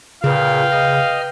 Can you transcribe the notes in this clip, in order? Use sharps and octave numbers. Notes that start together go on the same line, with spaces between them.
A#2 C#3 B4 F5 G5
D#5 F6